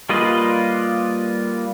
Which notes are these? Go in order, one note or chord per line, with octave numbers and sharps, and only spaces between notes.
G3 A#3 F4 B4 D#5